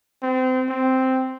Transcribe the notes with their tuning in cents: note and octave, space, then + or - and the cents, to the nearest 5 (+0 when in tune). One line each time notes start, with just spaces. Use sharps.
C4 -30
C4 -5